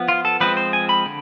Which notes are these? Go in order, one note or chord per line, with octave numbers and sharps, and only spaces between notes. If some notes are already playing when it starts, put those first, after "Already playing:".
Already playing: F3 B3
F4
A4
F3 G#3 C4 B4
C5
G#5
B5
D3